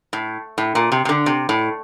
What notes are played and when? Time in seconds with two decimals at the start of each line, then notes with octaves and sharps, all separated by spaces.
0.13 A2
0.58 A2
0.75 A#2
0.92 C3
1.05 C3
1.09 D3
1.26 C3
1.49 A2